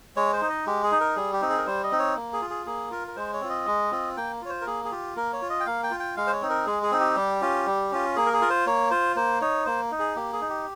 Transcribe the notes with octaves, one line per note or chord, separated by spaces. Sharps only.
G#3 C#5
C5
D#4
D#5
G#3 G4
G#4
D#4
A#4
G3 G#4
G4
C4 D#4
G#4
A#4
G3 C5
D#5
C4 D#4
C#5
A#3
G#4
F4
G#4
A#3 G#4
F4 A#4
A#4
G#3 C5
C#5
C4 F4
D#5
G#3
C4 F4
A#3 G5
F4 C#5
C5
A#4
A#3 G#4
G#4
F4 G4
A#3 A#4
C#5
F4
D#5
G5
A#3 F5
G5
F4
G5
G#3 F5
C5
C#5
C4 D#4
A#4
G#3 G#4
G#4
C4 D#4
G4
G3
C#4 F4
G3
C#4 F4
A#3 G#4
A#4
G#4
F4 A#4
C5
A#3 C#5
F4 C5
A#3 C5
D#4 C#5
A#3 C5
D#4
G#4
A#3 G4
G#4
D#4
G4